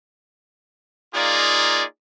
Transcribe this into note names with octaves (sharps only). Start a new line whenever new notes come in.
A#3 D#4 F4 G#4 D5